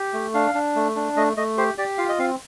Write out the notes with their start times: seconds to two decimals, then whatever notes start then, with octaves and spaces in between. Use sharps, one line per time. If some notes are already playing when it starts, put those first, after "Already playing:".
Already playing: G4
0.14 A3
0.34 D4 F5
0.55 D4
0.76 A3
0.96 D4
1.16 A3 D#5
1.37 A3 D#5
1.58 G4 C5
1.78 G4 D5
1.98 F4 F5
2.09 D#5
2.19 C4 F5